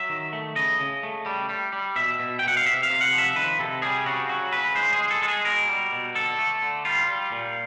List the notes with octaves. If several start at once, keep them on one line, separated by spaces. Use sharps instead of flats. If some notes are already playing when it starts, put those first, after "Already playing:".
Already playing: F#3 E5
D#3
A3
C#3 D#5
C#3
A3
G3
G3
G3
B2 E5
B2
G5
B2
F#5
F5
C3 E5
F5
C3
F#5
F3
E5
D#3 B4
C3 A4
G3 G#4
C#3 F#4
F#3 F#4
C#3 B4
G#3 C5
G#4
G#3
A4
G#3 A4
G#4
B2 A#4
G3
B2
D3 A4
A3
D3
G3 F4
G3
A#2